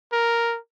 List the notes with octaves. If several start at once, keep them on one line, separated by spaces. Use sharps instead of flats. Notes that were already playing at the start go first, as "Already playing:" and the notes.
A#4